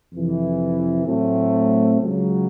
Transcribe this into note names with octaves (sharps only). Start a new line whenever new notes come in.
F2 C3 E3
A2 F#3 A3 C4
C#2 C#3 F#3